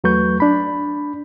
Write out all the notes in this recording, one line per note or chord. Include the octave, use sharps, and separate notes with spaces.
E2 F#3 A3 B4 C#6 G6
D4 B5